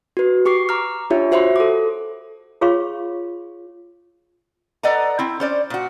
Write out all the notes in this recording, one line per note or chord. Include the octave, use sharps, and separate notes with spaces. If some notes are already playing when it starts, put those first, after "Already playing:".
F#4 B4
G4 C#6 D6 C7
A#5 D6 F6
D4 F4 G4 C#5 E5
F#4 C5 E5 F#5 B5 C6
A4 D6
F4 G#4 C#5 F5 C6 C#6
A4 B4 D5 D#5 F#5 A#5
C4 E4
C#4 C5 D5
A#2 F#4